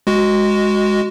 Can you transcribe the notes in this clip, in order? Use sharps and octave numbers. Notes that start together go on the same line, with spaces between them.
G#3 F#4